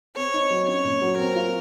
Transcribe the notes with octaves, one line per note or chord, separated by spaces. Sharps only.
C4 C#5
D#4
F#3
C#4 C#5
A#2
F#3
C4 A#4
F4